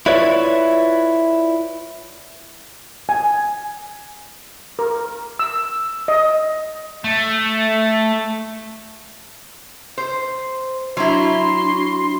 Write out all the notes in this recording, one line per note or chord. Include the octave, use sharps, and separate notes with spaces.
E4 F4 B4 C#5 D5 E5
G#5
A#4
E6
D#5
A3
C5
F#3 D4 E4 F#4 C6